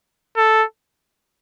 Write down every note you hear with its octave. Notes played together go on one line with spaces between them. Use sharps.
A4